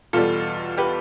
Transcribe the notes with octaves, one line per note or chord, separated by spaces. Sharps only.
E2 B2 G3 F4 A4
G4 B4